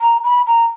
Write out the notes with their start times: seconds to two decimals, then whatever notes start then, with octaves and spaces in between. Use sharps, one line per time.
0.01 A#5
0.24 B5
0.47 A#5